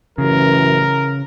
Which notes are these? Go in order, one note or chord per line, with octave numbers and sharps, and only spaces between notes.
A1 F#2 C#3 E3 A#4